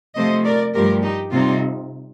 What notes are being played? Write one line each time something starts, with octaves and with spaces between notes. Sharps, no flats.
C3 F3 A3 C5 D#5
A#4 D5
G2 F3 A3 G4 A#4
D#4 G4
C3 G3 C4 D#4 F4